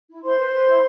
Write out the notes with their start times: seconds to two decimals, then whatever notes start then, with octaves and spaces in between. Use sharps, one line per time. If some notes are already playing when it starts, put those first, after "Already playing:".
0.09 E4
0.23 E4 C5 C6
0.38 B4
0.53 B4
0.67 E4